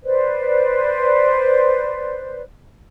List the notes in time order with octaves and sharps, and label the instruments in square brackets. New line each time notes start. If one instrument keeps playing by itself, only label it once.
[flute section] B4 C5 D5